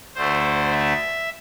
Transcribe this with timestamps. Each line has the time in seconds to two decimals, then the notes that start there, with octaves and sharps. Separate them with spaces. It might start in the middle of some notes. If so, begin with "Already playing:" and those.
0.15 D2 D3 A3 C5
0.71 E5